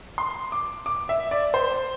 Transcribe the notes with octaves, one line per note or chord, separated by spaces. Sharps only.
C6
D6
D6
E5
D5
C5